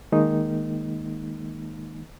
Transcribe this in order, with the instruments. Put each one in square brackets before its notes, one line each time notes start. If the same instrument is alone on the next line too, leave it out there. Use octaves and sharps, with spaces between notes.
[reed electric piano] D#3 G#3 A#3 D#4